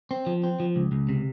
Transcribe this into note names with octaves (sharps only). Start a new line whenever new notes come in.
C4
F3
C4
F3
C#2
C#2
C3